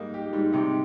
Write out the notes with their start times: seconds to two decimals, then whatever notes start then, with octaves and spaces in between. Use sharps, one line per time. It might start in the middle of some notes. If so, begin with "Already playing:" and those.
Already playing: G#2 G3 A#3 D#4
0.14 G4
0.33 G#2 G3
0.53 G#2 C3 D#4